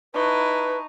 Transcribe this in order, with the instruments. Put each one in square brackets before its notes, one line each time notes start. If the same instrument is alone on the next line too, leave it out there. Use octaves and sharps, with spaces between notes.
[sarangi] D#4 [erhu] E4 [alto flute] B4 [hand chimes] A5 C#6